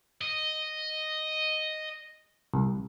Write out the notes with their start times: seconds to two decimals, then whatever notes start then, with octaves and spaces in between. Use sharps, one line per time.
0.21 D#5
2.54 C2